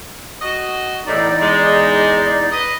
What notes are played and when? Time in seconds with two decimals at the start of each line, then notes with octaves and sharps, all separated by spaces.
0.41 F#4 D#5
1.06 E2 A2 D#4 D5
1.41 G#3
2.52 B4 D#5